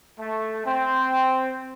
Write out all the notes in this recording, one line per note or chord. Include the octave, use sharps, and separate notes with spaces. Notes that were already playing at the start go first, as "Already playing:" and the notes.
A3
C4